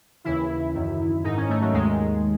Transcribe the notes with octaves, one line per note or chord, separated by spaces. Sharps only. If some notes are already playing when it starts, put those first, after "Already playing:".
D#2 C#3 E3 E4
F#2 D#3
G#2 D#3 D#4
C#4
A3
F#3
D#2 D#3 G#3